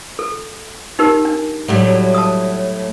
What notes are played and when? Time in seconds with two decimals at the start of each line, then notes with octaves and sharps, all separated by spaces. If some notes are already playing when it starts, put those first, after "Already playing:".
0.19 A4
0.99 D#4 G4 A#4
1.25 D4
1.68 A2 F#3 G3
2.14 A5 D#6